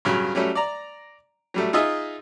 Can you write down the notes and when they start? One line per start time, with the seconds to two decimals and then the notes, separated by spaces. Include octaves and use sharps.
0.05 G2 C#3 F#3
0.35 F#3 G3 A3 C#4
0.55 D5 A#5
1.54 F#3 G3 A3
1.73 D#4 F4 G#4 D#5 E5